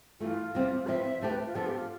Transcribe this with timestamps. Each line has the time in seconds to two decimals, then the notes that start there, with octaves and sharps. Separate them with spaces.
0.20 G2 E3 A3 F4
0.54 D2 C3 G3 C4
0.88 F3 C4 E4 B4 E5
1.21 D2 D3 A3 D4 G4 C5
1.30 B4
1.46 F4
1.55 F3 B3 D4 A4
1.66 G4
1.78 F4